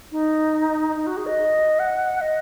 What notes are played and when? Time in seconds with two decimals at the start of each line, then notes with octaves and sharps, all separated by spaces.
0.12 D#4
0.96 D#4
1.07 F#4
1.17 G#4
1.26 D#5
1.79 F#5
2.21 D#5